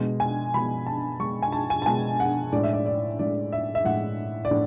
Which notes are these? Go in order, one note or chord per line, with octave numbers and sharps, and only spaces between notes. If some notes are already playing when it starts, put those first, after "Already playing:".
Already playing: B2 G#3
G#5
B2 G#3 B5
A5
B2 G#3 C#6
G#5
A5
G#5
A5
B2 G#3 G#5
F#5
A2 G#3 D5
E5
D5
D5
A2 G#3 D5
E5
E5
A2 G#3 F#5
D5
A2